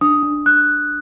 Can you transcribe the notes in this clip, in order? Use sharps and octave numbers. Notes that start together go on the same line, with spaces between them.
D4 D#6
D4
D4 F#6